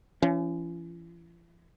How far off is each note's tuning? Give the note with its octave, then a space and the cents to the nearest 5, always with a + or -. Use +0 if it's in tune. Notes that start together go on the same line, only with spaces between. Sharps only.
E3 +45 C#4 +15